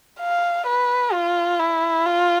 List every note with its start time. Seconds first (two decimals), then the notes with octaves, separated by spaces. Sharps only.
0.20 F5
0.66 B4
1.13 F4
1.59 E4
2.06 F4